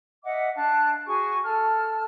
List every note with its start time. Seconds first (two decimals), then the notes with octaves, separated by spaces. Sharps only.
0.23 D#5 E5 F#5 D6
0.55 D4 F5 A5 F#6
1.05 F#4 G#4 G#5 C#6
1.43 A4 A5 F6